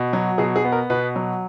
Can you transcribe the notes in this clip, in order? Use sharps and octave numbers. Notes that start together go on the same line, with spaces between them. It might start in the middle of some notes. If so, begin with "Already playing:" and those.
Already playing: B2
F#3
B2 G#4
G#4
B3
A#4
B2 B4
F#3